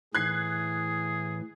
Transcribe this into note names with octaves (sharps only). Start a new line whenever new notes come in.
A2 E3 G#4 F#6 G#6 C7